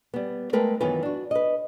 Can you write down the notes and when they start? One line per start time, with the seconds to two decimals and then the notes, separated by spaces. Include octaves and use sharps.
0.14 G3 B3
0.53 G#3 A3 A#4 B4 G5
0.80 F#2 D#3 E3 B3 F4 B4
1.03 D4 F#4
1.31 B4 D#5